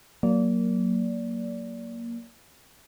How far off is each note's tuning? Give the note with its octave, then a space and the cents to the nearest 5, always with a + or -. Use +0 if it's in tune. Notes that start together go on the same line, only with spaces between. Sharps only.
F#3 +0 A#3 +0 D5 -25